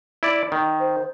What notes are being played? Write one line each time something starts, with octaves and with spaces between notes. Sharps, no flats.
E4 D5
D#3
C5